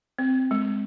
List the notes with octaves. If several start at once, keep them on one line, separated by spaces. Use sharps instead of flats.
C4
G#3